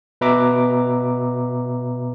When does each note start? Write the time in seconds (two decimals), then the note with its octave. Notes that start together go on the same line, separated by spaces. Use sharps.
0.21 B2 B4 E5 A#5 D6